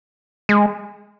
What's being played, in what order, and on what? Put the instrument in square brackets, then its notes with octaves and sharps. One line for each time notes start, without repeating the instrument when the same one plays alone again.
[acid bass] G#3